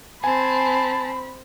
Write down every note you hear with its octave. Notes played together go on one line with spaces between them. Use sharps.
C4 G#5 A5 B5